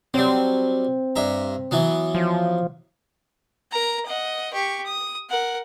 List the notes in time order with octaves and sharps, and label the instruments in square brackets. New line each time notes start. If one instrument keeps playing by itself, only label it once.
[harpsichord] F#3 G3 [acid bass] C4
[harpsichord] G2 E5 A#5
E3 F#3 B3
[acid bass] F3
[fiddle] A#4 A#5
D#5 F#5
G4 C#6
D#6
A#4 F#5